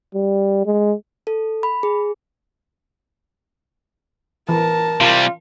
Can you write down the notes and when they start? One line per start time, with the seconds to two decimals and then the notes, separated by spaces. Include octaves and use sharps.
0.15 G3
0.66 G#3
1.27 A4
1.63 B5
1.83 G#4
4.49 E3 A#4 A5
5.01 C3 G3 F4